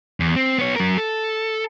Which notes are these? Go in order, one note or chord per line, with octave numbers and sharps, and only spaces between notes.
E2
C4
B3 C#5
F#3 A#4
A4